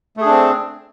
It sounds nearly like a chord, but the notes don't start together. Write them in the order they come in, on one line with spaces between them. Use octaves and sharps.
A3 G#4 D4 C4